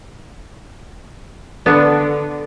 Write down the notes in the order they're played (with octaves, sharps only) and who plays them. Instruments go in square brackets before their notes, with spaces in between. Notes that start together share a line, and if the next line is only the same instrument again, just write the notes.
[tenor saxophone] D3 [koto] B3 D4